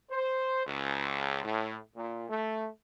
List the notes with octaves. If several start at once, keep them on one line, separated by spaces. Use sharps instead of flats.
C5
C#2
A2
A#2
A3